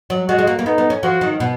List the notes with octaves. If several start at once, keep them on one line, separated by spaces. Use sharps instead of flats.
F#3
G#3 F#4
G#3
A#3
A#3
B3 D#4
B3
C#4
F3 F#4
D#3
B2